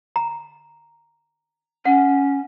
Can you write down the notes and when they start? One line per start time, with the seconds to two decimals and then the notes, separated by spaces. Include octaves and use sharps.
0.16 A#5
1.85 C#4 F#5